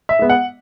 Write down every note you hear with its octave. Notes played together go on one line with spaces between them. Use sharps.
E5
G#3 B3
F#5